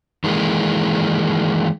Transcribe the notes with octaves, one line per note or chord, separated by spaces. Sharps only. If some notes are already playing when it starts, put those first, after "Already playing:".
D#3 E3 G#3 A#3